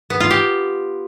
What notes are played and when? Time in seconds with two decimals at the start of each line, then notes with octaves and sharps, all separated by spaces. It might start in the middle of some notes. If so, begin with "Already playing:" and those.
0.10 B3
0.20 F4
0.31 G4